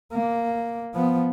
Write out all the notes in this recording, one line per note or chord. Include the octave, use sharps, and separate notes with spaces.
A#3
F3 B3